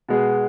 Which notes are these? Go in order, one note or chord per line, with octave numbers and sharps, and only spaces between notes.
B2 G#3 B3 G#4